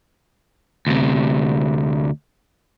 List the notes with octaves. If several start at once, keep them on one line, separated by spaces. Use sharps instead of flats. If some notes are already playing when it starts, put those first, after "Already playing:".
D2 C3